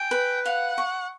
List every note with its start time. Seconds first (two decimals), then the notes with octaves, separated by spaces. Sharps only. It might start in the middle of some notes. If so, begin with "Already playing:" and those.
Already playing: G5 G#5
0.11 B4
0.45 F5 F#5
0.78 C#6